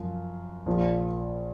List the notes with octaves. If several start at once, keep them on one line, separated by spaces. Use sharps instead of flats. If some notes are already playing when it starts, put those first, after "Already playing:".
Already playing: F#2 F3
A#1 A#2 F3